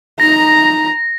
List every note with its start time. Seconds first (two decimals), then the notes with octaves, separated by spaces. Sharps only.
0.20 D#4 A#5 A#6